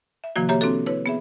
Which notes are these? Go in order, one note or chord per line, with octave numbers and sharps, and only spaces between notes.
E5
C3 D#3 F3 A#3 F#4
A#3 G4 C#5 E5 A#5
C4 D4 F#4 A4
E4 B4 C#5
B3 G#4 E5